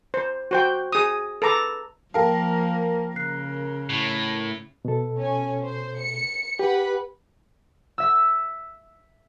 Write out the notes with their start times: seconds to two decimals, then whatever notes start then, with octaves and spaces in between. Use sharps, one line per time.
0.14 C5
0.51 F#4 C5 G5
0.92 G#4 D#6
1.42 A4 B4 A#5 D6
2.14 F3 A#3 A#4 F5 G5 A5
3.16 C#3 F#6 C7
3.89 A2
4.85 B2 A4
5.19 C#4 G#5
5.61 C5
6.00 C#7
6.59 G4 B4 F#5 B5
7.98 E5 E6